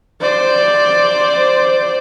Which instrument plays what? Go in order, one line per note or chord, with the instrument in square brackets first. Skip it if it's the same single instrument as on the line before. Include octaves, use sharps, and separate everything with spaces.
[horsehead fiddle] C5 D5